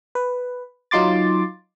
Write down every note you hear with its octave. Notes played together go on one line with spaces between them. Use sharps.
B4
F#3 D#4 F4 C6 D6 A6